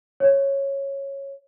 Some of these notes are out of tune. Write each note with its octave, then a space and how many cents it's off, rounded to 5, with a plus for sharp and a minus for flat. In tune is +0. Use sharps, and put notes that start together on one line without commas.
C#5 -10